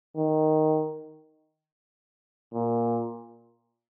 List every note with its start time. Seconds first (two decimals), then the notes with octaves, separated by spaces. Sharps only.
0.16 D#3
2.53 A#2